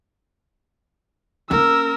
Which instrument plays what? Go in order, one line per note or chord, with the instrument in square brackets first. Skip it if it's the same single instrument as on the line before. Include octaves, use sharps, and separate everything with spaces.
[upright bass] A#3 C#4 [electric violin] A#4 E6